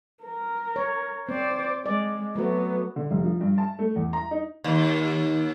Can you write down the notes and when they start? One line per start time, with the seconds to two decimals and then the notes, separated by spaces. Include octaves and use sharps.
0.23 A#4
0.76 C#5
1.29 C4 C5 D5
1.86 G#3 D5
2.36 F#3 A3 B3 F#4
2.96 D3
3.11 F1
3.24 F3
3.41 G2
3.58 A5
3.79 A3
3.96 E2
4.13 A#5
4.31 D#4
4.64 D#2